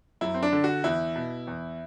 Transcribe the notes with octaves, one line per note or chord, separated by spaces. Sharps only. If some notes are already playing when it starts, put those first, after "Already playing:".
F#2 E4
C4
D4
D3
F#4
E2 E4
B2
E2